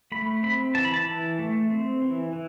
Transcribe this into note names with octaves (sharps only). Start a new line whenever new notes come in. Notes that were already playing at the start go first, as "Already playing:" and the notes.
A3 B5
C4 B5
E3 A5
B5
A5
E3
A3
C4
E3
E3